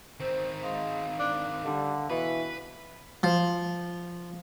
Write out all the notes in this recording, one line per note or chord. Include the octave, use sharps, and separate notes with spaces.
D#3 C4 C5
G#3 F5
D4
D3 G3
B2 E3 B4
F3